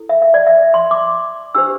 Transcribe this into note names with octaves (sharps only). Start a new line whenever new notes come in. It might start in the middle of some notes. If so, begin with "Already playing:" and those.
Already playing: E4 A4
E5
E5
D5
E5
C6
D6
D4 G4 C5 E6